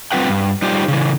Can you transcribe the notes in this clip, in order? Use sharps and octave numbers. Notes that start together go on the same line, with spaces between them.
G3 C4 F4 B4 F#5 G5
G2
G3 D#4 F4 G4 C5 D5
C#3 E3